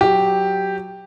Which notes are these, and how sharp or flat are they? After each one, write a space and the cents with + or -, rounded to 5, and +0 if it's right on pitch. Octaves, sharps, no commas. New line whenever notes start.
F#3 +0 G4 +0